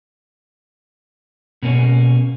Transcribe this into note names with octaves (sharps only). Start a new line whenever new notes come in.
B2 A#3 C#4